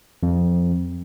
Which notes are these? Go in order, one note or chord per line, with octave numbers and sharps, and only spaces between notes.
F2